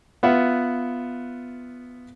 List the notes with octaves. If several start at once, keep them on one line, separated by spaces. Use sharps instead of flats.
B3 F4 E5 F#5